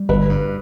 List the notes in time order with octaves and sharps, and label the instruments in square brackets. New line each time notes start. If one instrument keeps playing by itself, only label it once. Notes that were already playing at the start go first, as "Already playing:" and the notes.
Already playing: [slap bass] G3
[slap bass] G1 [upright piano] B4
[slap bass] G2